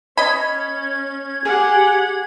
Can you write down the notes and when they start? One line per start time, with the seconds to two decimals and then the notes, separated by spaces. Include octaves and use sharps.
0.17 C#4 D#5 B5 G#6
1.45 G4 G#4 F#5